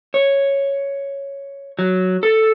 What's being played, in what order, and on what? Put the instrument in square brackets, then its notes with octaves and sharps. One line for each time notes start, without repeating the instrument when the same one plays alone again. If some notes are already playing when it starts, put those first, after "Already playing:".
[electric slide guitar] C#5
F#3
A4